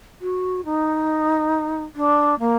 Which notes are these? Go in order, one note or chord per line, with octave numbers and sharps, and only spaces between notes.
F#4
D#4
D4
A#3